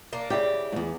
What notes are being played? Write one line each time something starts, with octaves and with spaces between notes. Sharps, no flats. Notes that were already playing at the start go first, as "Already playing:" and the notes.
A#3 D4
C#3 E4 G4 D5
E2 G#2